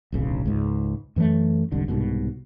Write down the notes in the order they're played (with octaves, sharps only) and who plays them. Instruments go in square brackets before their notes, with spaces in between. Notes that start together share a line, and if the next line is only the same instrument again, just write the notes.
[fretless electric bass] D1 B1 C#3
C#2 G#2
F#2 E3 F#3 A3
F1 C2 G#2 D3
C2 G#2 B2